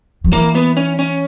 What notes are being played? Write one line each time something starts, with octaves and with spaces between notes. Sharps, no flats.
F3
E3 A#3
B3
C#4
C#4